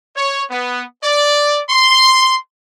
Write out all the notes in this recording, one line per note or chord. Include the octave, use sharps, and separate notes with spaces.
C#5
B3
D5
C6